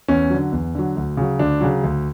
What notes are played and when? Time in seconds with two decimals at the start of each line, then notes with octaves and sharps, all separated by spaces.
0.08 E2 C#4
0.30 D3 F#3
0.52 E2
0.75 D3 F#3
0.96 D2
1.17 C#3 F#3
1.39 D2 D4
1.61 C#3 F#3
1.83 D2